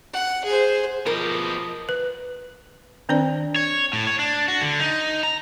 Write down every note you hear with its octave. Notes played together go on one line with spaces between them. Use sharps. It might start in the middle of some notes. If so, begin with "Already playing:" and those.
F#5
G#4 C5
B2 F3 G4 A#4 D#5
B4
D#3 C4 D4 C5 D5
C#5
A2
C#5
D4
F#4
D3
D#4
A#5